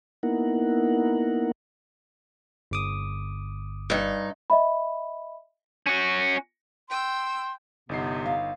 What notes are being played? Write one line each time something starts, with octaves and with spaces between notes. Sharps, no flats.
A#3 B3 D#4 E4 A#4 F#5
G1 D6 D#6
G2 D#4
D#5 E5 B5
C#4 F#4
G5 C6 E6
G1 C3 B3 D#4 C7
F5